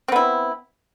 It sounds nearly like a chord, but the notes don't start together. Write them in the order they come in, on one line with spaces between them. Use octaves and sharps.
C4 B3 E4